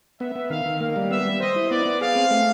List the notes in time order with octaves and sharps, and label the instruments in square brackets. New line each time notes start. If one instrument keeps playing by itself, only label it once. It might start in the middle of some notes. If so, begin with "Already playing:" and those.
[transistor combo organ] B3 [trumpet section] E5
[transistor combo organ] B3
[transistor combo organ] D#3 [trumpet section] F5
[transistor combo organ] D#3
[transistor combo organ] A#3 [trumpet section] F5
[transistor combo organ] G3
[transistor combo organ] B3 [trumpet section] E5
[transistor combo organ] G3
[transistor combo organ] C5 [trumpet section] D#5
[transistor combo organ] E4
[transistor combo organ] B3 [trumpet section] D5
[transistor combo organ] B3
[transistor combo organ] G#4 [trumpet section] F5
[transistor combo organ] C4
A3